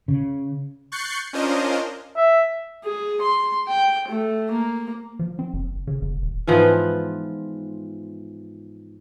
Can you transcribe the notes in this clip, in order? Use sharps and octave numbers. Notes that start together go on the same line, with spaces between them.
C#3
C#6 F#6 G6 A6 C7 C#7
C#4 D4 F4 A#4 C5 D#5
E5
G#4
C6
G5
A3
A#3
F3
C4
F#1
C#3
F#1
D#1
G#2 E3 F3 B3